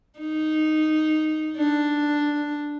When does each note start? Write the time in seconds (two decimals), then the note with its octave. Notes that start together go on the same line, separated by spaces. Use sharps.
0.19 D#4
1.57 D4